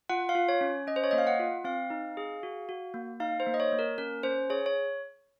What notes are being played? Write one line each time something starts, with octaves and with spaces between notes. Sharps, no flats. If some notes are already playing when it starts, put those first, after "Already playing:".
F4 F#5
F5
F4
C#5
C#4
C#4 D#5
C5
C#5
A#3 D#5
F5
F#5
F4
C4 F5
D#4
G#4
F#4
F#4
A#3
D#4 F5
C5
A#3
D#5
C#5
A#3
A#4
C#4 A#4
C#4 C5
G#4 C#5
C#5